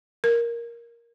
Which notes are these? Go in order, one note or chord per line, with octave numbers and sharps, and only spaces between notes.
A#4